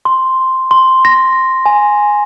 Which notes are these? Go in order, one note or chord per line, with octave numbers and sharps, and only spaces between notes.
C6
C6
A#6
G#5